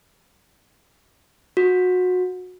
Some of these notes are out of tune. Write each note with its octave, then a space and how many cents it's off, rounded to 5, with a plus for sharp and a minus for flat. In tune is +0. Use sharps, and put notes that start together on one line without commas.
F#4 -25